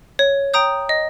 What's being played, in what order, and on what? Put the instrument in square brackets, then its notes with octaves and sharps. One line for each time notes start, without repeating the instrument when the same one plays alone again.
[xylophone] C#5
G5 A#5 D#6 G6
D#5